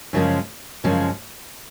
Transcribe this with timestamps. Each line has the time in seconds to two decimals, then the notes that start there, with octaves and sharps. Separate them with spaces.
0.13 F#2 C#3 F3 G#3 C#4
0.84 F#2 C#3 F3 G#3 C#4